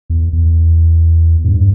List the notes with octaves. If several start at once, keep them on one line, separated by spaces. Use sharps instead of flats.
E2
E2
G#2
G2